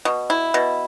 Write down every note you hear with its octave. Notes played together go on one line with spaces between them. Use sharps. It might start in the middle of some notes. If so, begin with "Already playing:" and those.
B2
E4
B2